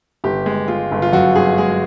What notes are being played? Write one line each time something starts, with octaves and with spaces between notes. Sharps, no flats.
G1 G4
G#3
G#3 F4
G1
F4
F#2 F#4
G1 G#4
G#3 G#4